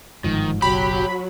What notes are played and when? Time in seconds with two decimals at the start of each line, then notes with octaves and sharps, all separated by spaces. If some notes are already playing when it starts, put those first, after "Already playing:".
0.24 G1 G#2 D#3 F3
0.62 F#1 B1 F#3 G4 B5